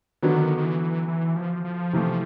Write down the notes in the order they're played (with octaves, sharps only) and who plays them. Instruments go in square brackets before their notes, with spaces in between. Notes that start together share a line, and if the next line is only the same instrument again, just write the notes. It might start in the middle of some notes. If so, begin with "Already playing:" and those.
[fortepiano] D3 F#3 B3 [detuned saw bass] D#3
[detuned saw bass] D#3
E3
E3
F3
F3
[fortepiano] C3 E3 A3